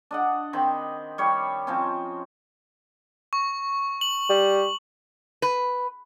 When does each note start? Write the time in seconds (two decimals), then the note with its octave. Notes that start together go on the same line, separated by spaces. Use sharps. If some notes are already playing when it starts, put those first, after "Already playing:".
0.11 D4 D#5 F#5
0.53 D#3 C4 B5
1.18 G3 C#5
1.67 F3 C4 C#4
3.33 C#6
4.01 F#7
4.30 G3
5.42 B4